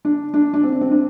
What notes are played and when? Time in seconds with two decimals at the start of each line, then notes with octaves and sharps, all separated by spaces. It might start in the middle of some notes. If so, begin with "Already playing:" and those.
0.05 D4
0.34 D4
0.54 D4
0.63 C4
0.81 C4
0.92 D4